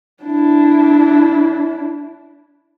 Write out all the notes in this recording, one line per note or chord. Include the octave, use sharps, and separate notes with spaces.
D4 E4